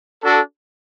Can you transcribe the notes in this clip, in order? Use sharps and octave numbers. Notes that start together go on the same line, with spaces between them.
D4 F#4 A4